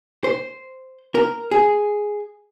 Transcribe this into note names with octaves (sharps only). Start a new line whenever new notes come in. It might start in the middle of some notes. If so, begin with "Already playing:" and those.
C5
A#4
G#4